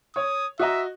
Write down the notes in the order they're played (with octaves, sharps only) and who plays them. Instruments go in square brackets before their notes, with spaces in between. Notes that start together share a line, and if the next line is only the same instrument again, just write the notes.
[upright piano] C#5 [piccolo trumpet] D#6
[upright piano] F#4 D#5 A#5 [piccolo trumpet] E5